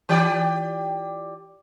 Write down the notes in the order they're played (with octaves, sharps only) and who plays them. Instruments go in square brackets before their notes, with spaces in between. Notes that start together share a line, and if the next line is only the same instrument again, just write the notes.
[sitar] E3 G4 D5